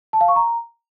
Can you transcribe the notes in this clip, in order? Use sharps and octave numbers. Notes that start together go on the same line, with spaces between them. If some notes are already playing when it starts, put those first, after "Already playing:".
A5
F5
C#6
A#5